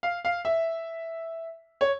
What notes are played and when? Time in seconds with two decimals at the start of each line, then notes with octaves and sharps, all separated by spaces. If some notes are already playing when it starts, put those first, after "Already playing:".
0.03 F5
0.25 F5
0.45 E5
1.81 C#5